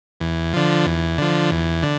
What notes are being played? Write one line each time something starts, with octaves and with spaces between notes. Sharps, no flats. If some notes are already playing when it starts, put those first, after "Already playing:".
E2
D3 F3
E2
D3 F3
E2
D3